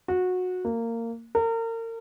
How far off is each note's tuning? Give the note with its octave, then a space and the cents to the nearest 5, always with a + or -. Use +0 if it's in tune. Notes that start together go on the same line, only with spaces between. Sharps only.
F#4 -20
A#3 -20
A#4 -35